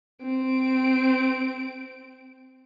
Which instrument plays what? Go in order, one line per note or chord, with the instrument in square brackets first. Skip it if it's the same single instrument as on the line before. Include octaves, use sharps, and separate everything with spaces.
[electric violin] C4 D7